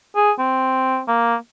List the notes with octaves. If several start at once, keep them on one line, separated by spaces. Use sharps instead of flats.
G#4
C4
A#3